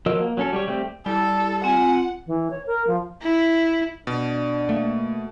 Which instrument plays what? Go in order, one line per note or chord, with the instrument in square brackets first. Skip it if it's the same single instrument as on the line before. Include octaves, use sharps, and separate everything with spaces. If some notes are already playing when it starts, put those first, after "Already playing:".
[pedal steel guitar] F3 F#3 A#4 D#5 E6
A#3
F#3 C#4 A4
G3 G4 C#5
G3 A3 C4 G4
[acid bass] G3 [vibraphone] E4 [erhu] A4
[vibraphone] C4 F4 [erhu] F#5 [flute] G#5
[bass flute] E3
C#5
A#4
F3
[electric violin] E4
[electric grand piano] B2 [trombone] D4
[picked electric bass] A3 [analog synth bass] A#3